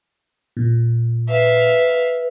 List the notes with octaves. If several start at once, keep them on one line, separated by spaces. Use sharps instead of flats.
A#2
B4 E5 F5